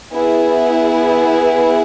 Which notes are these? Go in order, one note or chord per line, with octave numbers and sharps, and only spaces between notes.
B3 E4 G#4